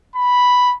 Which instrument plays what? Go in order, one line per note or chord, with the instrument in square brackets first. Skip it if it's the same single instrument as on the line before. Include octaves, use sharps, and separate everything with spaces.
[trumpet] B5